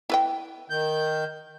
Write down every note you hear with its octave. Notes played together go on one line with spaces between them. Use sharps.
E4 B4 G5
D#3 G6